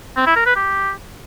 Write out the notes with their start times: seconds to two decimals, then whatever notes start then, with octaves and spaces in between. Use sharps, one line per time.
0.16 C4
0.26 E4
0.36 A#4
0.46 B4
0.56 G4